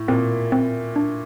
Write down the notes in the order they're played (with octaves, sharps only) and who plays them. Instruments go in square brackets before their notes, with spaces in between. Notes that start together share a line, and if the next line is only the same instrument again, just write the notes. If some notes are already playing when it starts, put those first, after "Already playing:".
Already playing: [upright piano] A2
[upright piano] A#2 [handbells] C4
[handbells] C4
D4